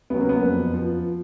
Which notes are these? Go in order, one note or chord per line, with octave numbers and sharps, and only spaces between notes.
C#3 F#3 B3
A#3
B3
F2
F3